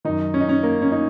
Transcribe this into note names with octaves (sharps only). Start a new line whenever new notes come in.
F#2 D#3 D#4
C#4
D#4
C#4
A#3
C#4
D#4